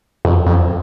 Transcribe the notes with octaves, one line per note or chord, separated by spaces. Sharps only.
F2
F2